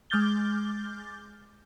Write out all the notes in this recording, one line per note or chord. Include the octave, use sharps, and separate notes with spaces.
G#3 D6 F6 G6 A6 G7